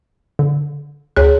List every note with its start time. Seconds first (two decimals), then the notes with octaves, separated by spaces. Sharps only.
0.39 D3
1.16 D2 G#4 C#5 F#6